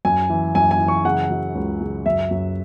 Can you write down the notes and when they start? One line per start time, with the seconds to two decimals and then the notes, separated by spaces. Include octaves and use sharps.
0.05 F#2 G#5
0.30 E3
0.55 F#2 G#5
0.71 G#5
0.80 E3
0.88 C#6
1.04 C#3 F#5
1.30 F#3
1.55 C#2
1.80 C#3
2.06 F#2 E5
2.31 F#2